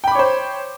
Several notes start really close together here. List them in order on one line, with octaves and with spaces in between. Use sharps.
G5 B5 D6 C#5 C5